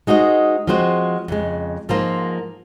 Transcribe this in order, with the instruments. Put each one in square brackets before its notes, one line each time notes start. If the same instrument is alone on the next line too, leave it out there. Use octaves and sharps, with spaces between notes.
[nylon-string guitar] G#3 D#4 F#4 C5 D#5
F3 G#3 C4 F#4 C5
F2 C#3 G#3
G#2 F3 A#3 F4 C5